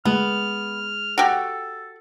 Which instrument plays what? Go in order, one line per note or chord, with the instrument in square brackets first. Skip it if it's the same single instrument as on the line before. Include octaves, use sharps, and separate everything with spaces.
[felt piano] G#3 [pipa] B3 [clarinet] F6
[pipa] F#4 G4 [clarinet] A4